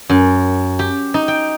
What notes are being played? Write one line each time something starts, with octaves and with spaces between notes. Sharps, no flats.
F#2
G4
D#4
G5